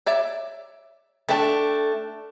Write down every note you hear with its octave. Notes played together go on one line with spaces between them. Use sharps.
C#5 D5 E5
A3 D4 A4 G5